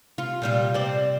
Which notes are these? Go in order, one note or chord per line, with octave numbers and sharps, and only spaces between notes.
C3 F4
A#2 G3 F4
C4 D5